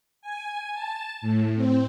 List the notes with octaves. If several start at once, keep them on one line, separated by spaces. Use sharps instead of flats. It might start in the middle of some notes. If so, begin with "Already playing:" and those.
G#5
A5
A2
C4